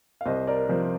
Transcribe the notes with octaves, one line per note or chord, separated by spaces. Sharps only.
F5
C2 C5 D#5
A#4 D5
C3 F3 C5